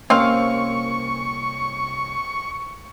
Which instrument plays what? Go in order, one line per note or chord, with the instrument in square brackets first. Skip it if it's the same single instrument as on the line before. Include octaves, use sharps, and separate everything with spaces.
[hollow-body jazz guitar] C2 A#3 C#4 [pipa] C4 F5 [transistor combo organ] C#6